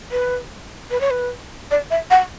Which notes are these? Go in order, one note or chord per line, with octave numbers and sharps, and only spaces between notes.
B4
B4
C#5
B4
D5
E5
F#5